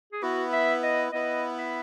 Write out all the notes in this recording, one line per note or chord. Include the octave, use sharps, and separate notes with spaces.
G#4
B3 E4 F#4 B4
E5
D#5
B3 E4 B4 D#5
E5